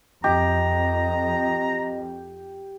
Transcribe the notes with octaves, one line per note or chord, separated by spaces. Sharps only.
F2 G4 D#5 A#5